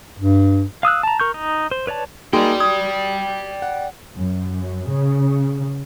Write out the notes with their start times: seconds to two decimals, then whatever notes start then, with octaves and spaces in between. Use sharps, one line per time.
0.19 G2
0.83 F5 D#6 E6 F#6
1.03 A5 A#5
1.20 A#4 C#6 G6
1.34 D#4
1.71 C5
1.87 B4 C#5 D5 A5
2.33 A#3 D#4 F#4 G#4 D5 G5
2.60 D#6 G#6
3.62 F#5
4.16 F#2
4.90 C#3